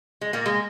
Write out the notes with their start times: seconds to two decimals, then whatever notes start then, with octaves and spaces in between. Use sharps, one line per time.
0.21 G#3
0.33 A#2 A#3
0.46 G#3